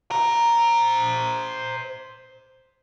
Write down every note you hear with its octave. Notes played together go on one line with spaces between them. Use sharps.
C5 A#5